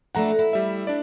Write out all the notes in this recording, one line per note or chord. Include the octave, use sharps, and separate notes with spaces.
E3 A3 D4 F#5 A#5
E4
G3 E5
D4 D5